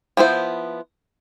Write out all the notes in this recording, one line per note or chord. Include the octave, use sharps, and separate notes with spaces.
F3 B3 E4 C5